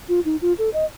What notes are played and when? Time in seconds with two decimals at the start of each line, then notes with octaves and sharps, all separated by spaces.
0.09 F4
0.25 D#4
0.42 F4
0.58 A4
0.74 D#5